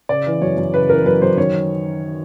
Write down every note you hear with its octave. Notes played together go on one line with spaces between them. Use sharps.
C#3 D5
E3
F#2 C#5
F#2
C#3 B4
E3 A#4
F#2 B4
F#2 C5
D#3 C#5